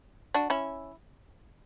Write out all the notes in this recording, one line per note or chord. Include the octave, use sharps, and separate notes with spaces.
D4 F#4
C#4 E4